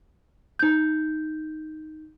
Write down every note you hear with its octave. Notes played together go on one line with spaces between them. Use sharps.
D#4 G6